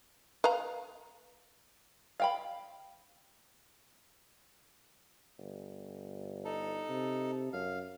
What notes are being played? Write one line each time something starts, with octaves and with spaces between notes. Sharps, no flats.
B4 F5 A#5
F5 G5 B5
G1
D#4 A4
C3
F#2 F5